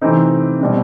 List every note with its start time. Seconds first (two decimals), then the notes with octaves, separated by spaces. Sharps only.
0.01 C3 E3 A3 C4 D#4
0.61 B2 G3 C4